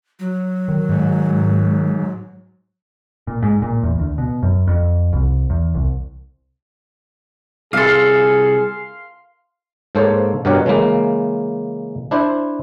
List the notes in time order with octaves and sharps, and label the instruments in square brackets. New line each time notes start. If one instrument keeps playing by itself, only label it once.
[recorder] F#3
[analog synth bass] D#3
[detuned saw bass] G#2
[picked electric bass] A#2
G#2
A#2
E2
D2
B2
F#2
F2
C2
E2
C2
[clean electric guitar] C2 A4 [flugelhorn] G#4 [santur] F5 C6
[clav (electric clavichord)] G#2 A#3 A4 C5 C#5
G2 B2 G4 A#4 C#5 F#5
C#3 E3 G#3 A#3
D4 E4 C5